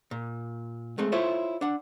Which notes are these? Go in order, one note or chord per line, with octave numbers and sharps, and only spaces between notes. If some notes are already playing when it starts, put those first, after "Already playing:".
A#2
G#3 A3 C4
E4 F4 A4 C5 C#5 E5
D4 F#5